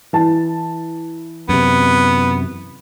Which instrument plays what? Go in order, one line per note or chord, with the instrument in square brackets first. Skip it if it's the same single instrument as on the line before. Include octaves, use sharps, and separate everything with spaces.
[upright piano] E3 A5
[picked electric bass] F#2 C3 [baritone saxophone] B3